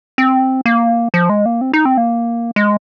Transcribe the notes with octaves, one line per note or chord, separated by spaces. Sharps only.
C4
A#3
F3
G#3
A#3
C4
D#4
C4
A#3
G#3